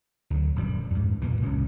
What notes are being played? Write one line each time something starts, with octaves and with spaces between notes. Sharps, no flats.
D2 F#3
D#1 F#2 G3
F2 G#2
B1 A#2 E3
E1 C#2 C#4